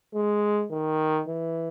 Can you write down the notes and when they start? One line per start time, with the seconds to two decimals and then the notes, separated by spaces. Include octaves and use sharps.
0.15 G#3
0.71 D#3
1.27 E3